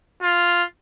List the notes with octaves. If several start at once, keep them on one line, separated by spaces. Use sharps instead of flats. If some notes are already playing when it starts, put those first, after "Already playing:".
F4